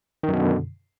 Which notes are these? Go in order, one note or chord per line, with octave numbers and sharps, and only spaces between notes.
F#2 B2 D3 D#3